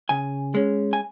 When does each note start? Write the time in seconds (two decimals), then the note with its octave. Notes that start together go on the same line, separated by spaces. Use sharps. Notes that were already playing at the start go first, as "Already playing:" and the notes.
0.09 C#3 G#5
0.55 G#3 C#4
0.93 G#5